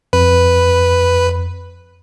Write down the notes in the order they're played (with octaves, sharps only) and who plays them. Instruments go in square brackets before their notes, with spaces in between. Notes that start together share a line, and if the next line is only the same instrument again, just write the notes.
[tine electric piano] F2 [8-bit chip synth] B4